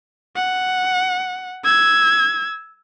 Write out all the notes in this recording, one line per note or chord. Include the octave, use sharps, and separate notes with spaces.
F#5
E6 G#6